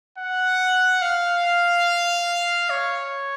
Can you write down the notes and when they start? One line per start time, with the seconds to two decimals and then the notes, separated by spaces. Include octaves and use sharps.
0.18 F#5
1.02 F5
2.70 C#5